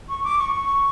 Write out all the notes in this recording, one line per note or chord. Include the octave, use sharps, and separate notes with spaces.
C#6
D6
C#6